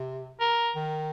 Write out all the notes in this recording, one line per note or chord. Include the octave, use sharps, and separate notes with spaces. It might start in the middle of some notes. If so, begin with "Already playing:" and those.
Already playing: C3
A#4
D#3